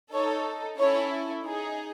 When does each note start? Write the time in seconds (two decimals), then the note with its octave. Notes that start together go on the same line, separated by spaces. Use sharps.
0.13 D#4 A4 C#5
0.78 C#4 E4 A4 C#5
1.43 D#4 G#4